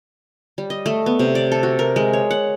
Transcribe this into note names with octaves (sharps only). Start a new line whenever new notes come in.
G3
D#5
A3
B3
C3
D5
A4
F#4
A#4
G#3
C#5
F#5